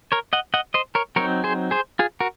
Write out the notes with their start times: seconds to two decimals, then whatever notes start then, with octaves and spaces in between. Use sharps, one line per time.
0.12 A#4 C#5
0.33 D#5 F#5
0.54 D#5 F#5
0.74 C5 D#5
0.95 A#4 C#5
1.16 F#3 C4 D#4 A#4 C#5
1.44 G#4 C5
1.71 G#4 C5
1.99 F4 G#4
2.20 F#4 A#4